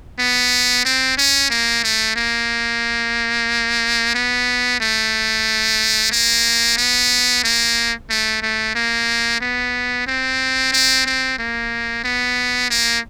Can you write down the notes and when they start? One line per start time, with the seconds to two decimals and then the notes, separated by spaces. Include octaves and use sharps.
0.19 B3
0.85 C4
1.17 C#4
1.50 A#3
1.84 A3
2.16 A#3
4.15 B3
4.80 A3
6.12 A#3
6.77 B3
7.44 A#3
8.10 A3
8.42 A3
8.75 A#3
9.41 B3
10.07 C4
10.72 C4
11.06 C4
11.38 A#3
12.04 B3
12.70 A#3